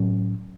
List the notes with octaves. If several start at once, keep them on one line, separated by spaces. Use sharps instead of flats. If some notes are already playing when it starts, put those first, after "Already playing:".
Already playing: A2 F#3 C#4